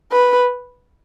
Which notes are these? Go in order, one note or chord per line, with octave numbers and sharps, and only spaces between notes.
B4